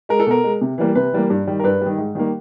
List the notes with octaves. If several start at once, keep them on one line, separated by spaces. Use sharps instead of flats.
G#3 A#4
A4
B2 A#4
G#3
C3
E3 G3 A#3
C3 B4
E3 G3 A#3
G2
D#3 G3
A#4
G2 B4
D#3 G3
G#2
D#3 G3 A#3